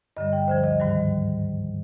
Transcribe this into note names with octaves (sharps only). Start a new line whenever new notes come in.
G2 D3 G3 D#5
G5
D2 D3 F3 C5
D#5
G#2 D#3 G3